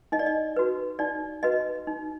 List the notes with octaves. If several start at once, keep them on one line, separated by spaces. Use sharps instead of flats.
D#4 D#5
D5
D#5
F#4 B4
D#4 D5
F#4 B4 D#5
D#4